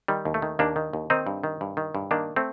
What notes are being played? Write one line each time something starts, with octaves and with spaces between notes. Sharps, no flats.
D#3 G3
D#2
A3
D#3
D#2 A#3 D4
D#3
D#2
D#3 C4 D#4
G2
D#3
G2
D#3
G2
D#3 A#3 D4
A3 C4